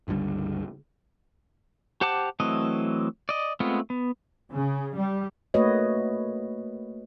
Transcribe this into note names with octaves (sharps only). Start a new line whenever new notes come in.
G1 C#2 D3 G3
G4 C5 F#5 A5 D6
E3 F#3 A3 C4 D#5
D5 D#5
G#3 A3 B3 C4 F4
B3
C#3
G3
A3 A#3 F#4 B4 C#5 D#5